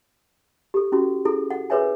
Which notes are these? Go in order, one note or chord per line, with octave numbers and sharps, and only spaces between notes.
G4 A4
C#4 E4 F#4 G4
E4 G#4 A4
F#5
G#4 A#4 B4 C#5 E5 G#5